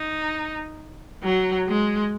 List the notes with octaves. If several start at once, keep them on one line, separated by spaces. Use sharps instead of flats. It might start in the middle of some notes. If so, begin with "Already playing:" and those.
Already playing: D#4
F#3
G#3